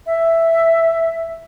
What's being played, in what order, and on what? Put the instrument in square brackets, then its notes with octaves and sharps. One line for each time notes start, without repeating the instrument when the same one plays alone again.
[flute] E5